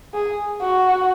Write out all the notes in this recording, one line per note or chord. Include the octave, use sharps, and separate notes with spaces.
G#4
F#4